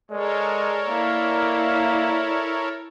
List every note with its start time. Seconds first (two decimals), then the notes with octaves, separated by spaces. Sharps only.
0.11 G#3 A4 A#4 C#5 D5
0.88 A#3 E4